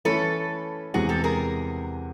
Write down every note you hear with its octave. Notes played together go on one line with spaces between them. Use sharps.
E3 A3 C#4 E4 A4 B4
E2 C3 E3 G#3 F#4 G#4
G4 A4
G#4 A#4